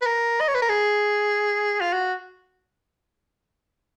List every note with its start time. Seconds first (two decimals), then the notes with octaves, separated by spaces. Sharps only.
0.02 B4
0.06 A#4
0.41 D#5
0.48 C#5
0.55 B4
0.62 A#4
0.69 G#4
1.81 F4
1.93 F#4